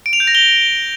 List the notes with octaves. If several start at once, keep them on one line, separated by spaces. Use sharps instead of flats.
D7
F7
G6
A#6
G7